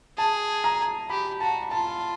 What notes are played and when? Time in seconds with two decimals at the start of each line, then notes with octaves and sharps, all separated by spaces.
0.18 G#4 A5
0.64 A#5
1.10 G4 B5
1.40 F#4 A5
1.71 F4 A5